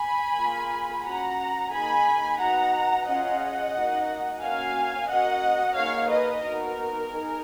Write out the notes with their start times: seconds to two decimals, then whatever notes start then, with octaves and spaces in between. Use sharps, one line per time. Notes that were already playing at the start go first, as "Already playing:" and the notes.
Already playing: G#5 B5
0.38 A#3 F4 G#4
1.05 C#4 F#4 F#5 A#5
1.72 A#3 D#4 G#4 G#5 B5
2.40 B3 D#4 F#4 F#5 A#5
3.07 C#4 F4 G#4 D#5 F#5
3.75 A#3 D#4 F#4
4.42 A#3 C#4 F#4 F5 G#5
5.09 A#3 C#4 F#4 D#5 F#5
5.76 A#3 D#4 G#4 C#5 F5
6.10 B4 D#5
6.43 B3 D#4 F#4 A#4
7.11 D#4 G#4